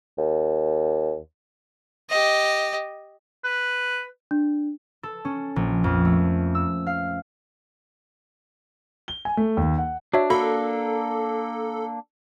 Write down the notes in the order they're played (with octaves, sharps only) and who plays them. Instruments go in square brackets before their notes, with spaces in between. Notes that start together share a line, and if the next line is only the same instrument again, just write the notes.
[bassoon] D#2
[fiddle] G4 D#5
[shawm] B4
[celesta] D4
[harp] A4
C#4
A#1
F2
A3
E6
F5
[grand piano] G7
G#5
A3
D#2
F#5
[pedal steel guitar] D4 [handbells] F#4 C#5 E5
[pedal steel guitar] A#3 D4 [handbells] F#4 B5 [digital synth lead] A4